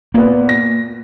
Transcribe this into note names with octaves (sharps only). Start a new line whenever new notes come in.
A#2 A#3 B3
A#6